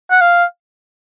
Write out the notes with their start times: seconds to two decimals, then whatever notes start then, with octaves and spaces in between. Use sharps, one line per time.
0.11 F#5
0.21 F5